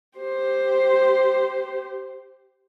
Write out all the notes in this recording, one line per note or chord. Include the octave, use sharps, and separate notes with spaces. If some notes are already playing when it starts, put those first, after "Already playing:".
G4 C5